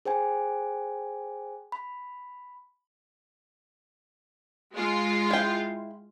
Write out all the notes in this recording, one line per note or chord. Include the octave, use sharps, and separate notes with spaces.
G#4 C5 G5 G#5
B5
G#3 F4
E4 G5